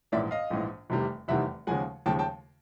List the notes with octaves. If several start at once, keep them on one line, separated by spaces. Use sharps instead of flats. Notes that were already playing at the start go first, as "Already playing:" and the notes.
A#1 G#2 E3 D5 E5
D#5 F5
A#1 G#2 E3
F1 E2 C3 D#3 G3
F1 E2 C3 D#3 G3 E5 F#5
D#2 C#3 F3 G#3 F#5 G#5
D#2 C#3 F3 G#3 G5 A5
G5 A5